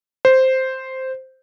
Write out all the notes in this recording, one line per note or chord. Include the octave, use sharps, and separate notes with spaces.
C5